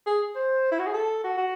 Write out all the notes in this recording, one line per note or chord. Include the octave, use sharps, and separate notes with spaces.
G#4
C5
E4
F#4
G#4
A4
F#4
F#4